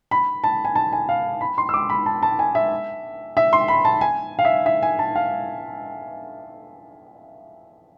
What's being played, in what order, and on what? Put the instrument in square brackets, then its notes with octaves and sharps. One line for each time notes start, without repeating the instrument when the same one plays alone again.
[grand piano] B5
A5
G#5
A5
G#5
F5
B5
C6
E6
D6
B5
A5
A5
G#5
E5
E5
C6
B5
A5
G#5
F5
E5
E5
G#5
A5
F5